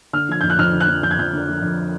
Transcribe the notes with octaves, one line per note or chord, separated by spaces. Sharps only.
D3 F6
F3 G#6
F2 G6
F#6
F2 F6
D3
F#6
F3
F2 G6
G#6
F2 G6
D3
F3
F2